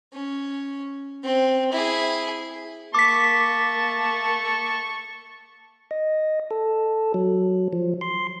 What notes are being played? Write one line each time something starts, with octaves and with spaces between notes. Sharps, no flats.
C#4
C4
E4 G#4
A#3 A5 C#6 D6 B6
D#5
A4
F#3
F3
C6